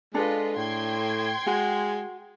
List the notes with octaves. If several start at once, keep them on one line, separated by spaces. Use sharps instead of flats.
G#3 D4 F4 A4 B4 D#5
A2 G5 C6 G#6
G#3 F#4